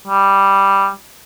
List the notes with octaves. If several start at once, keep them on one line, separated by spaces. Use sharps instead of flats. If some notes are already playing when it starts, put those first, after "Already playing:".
G3